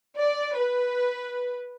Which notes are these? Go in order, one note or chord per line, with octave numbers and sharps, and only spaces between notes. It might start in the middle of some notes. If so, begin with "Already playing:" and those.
D5
B4